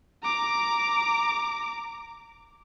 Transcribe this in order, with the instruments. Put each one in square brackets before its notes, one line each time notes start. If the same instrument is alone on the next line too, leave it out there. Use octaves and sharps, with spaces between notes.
[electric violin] A#5 D6